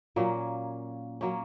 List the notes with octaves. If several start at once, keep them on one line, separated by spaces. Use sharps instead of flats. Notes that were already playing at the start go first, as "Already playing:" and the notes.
A#2 F#3 A#3 C#4
F#3 A#3 C#4